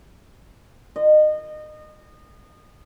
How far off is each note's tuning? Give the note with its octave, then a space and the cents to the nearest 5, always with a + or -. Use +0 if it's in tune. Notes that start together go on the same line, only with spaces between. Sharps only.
D#5 -25